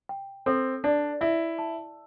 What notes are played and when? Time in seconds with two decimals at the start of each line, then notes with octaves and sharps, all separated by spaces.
0.09 G5
0.46 C4 A4
0.84 D4 D5
1.21 E4 E5
1.59 A5